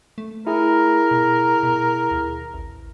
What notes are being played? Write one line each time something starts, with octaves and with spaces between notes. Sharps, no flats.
A3
E4 G#4 A#4
B2
B2
D#2
A1